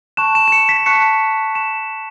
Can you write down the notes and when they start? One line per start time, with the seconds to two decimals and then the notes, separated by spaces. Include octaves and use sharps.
0.17 A5 C#6 F#6 E7
0.35 E7
0.48 E7
0.52 C#7
0.69 B6
0.86 A5 C#6 F#6 C#7
1.55 A5 C#6 F#6 E7